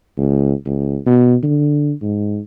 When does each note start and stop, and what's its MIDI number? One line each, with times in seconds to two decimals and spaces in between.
0.18 0.53 37
0.66 0.98 37
1.06 1.35 47
1.43 1.92 50
2.02 2.40 44